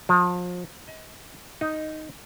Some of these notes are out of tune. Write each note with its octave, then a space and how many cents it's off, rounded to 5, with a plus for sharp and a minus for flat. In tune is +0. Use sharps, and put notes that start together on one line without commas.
F3 +35
D#5 +30
D#4 +0